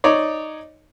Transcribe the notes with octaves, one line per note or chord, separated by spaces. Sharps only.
D#4 C#5 D5